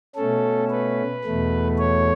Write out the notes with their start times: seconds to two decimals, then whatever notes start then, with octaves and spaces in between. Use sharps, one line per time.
0.16 B2 A3 C#4 A4
0.70 B4
1.24 E2 B2 A3
1.79 C#5